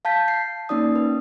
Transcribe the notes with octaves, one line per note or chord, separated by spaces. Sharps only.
F5 A5 G6 B6
C7
A#3 C#4 D#4 D5 D#6
B4